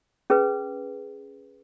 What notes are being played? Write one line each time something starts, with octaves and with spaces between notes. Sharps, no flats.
C#4 G#4 B4